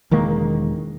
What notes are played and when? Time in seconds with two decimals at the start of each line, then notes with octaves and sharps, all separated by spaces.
0.11 E1 D#3 G#3 A#3